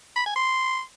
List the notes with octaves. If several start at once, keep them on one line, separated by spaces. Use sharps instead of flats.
B5
G#5
C6